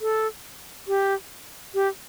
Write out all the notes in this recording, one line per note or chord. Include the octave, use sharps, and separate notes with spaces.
A4
G4
G4